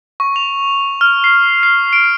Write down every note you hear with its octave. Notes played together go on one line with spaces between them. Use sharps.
C#6
F7
F6
C7
C7
D7